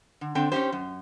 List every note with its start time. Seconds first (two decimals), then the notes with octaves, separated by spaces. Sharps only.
0.21 D3
0.35 D3 C4 G5
0.52 C#4 D#4 E4 G4 C5
0.72 F#2